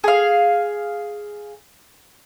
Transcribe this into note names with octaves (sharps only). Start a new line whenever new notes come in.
G#4 F5